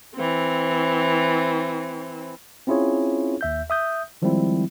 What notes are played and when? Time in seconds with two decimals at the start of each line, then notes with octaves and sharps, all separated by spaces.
0.15 E3 C4
2.67 C4 C#4 E4 F4 G#4 C#5
3.41 D#2 E5 G6
3.70 E5 D#6 G6
4.22 D#3 F3 G3 G#3 C4 E4